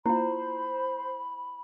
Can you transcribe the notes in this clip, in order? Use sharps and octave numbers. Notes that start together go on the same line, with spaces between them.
A#3 E4 F4 C5 B5